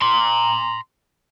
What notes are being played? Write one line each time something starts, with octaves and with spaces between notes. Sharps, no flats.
A#5 C6